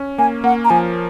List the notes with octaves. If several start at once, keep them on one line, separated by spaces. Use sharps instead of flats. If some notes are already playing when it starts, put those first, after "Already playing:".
Already playing: C#4
A#3 G#5
A#3 F#5
A#5
F3 G#5